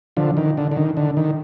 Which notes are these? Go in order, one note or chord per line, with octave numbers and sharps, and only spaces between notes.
D3 F3
D#3
D3
D3
D#3
D3
D#3